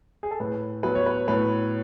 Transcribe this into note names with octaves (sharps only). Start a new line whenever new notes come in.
G#4
A4
A2 B4
F#3 B3 B4
C#5
B4
A2 B4